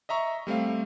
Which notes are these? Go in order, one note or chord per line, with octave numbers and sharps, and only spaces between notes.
D#5 E5 A#5 C#6
G3 A3 C4 F5